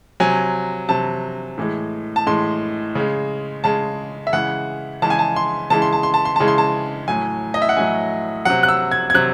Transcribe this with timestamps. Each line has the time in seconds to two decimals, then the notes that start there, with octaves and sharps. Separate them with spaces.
0.20 C3 F#3 G#5
0.89 C3 F#3 A5
1.58 A2 E3 G#3
2.16 A5
2.26 A2 E3 G#3 C6
2.95 C#3 G#3
3.64 C#3 G#3 A5
4.27 E5
4.33 C#3 E3 G#3 F#5
5.02 C#3 E3 G#3 A5
5.10 G#5
5.19 A5
5.36 C6
5.70 C#3 E3 G#3 A5
5.82 C6
5.93 A5
6.03 C6
6.14 A5
6.25 C6
6.36 C#3 E3 G#3 A5
6.48 C6
6.58 A5
7.08 A2 F#3 G#5
7.54 D#5
7.62 E5
7.69 F#5
7.77 A2 F#3 G#5
8.45 C3 F#3 F#5
8.63 F#6
8.69 E6
8.92 G#6
9.10 G#6
9.14 C3 F#3 F#6